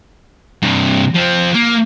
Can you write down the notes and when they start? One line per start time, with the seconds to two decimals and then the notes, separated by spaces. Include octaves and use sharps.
0.62 G2 C3
1.15 F3 C4
1.55 A#3